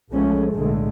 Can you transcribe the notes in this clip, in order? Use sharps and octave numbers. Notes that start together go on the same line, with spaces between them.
B1 F3 G#3 A3 C#4
B1 A2 D3 G#3 A3